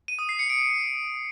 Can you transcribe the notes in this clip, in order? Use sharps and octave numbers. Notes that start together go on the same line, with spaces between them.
D#7
D#6
C7
C#7
D7